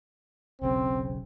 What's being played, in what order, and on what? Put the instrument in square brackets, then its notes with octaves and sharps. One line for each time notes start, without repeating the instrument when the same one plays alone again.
[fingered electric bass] E1 B1 C#3 [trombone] C4